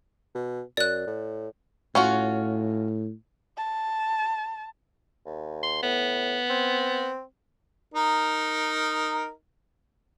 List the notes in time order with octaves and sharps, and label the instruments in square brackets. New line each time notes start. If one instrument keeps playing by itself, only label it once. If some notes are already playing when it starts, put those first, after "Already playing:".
[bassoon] B2
[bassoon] F#2 [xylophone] D5 F#6
[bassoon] A2
[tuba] A2 [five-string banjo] C#4 F4 F#4
[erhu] A5
[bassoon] D#2
[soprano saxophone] C6
[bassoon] A2 [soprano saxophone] B3
[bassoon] C4
[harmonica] D#4 A#4